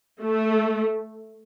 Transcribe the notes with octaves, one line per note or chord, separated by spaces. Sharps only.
A3